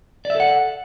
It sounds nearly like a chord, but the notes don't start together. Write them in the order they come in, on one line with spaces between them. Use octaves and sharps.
D5 E5 A4 F#5